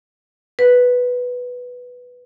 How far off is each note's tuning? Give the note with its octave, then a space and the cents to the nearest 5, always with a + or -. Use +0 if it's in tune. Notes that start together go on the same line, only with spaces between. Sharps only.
B4 +0